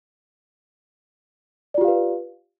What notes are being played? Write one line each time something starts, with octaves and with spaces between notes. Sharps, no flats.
F4 G4 B4 D5 F5